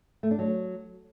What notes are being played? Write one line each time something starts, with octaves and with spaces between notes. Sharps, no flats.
A3
D4
F#3